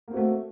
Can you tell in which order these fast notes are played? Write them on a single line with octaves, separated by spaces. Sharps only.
A#3 C4 F#4 A3